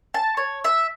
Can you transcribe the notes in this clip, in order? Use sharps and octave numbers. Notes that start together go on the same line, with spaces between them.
A5
C#5
E5